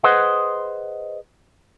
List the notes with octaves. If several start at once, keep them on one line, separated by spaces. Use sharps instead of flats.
G#4 B4 C5 D#5 F#5